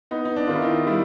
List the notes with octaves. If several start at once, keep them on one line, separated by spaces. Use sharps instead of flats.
B3 D#4
D#4
D4
D#3 F4
E4
D#4
G3 E4